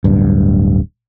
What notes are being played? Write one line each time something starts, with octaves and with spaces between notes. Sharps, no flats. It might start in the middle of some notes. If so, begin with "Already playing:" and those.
D1 G2